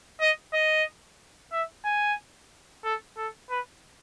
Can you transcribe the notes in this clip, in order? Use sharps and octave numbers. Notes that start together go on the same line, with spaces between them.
D#5
D#5
E5
G#5
A4
A4
B4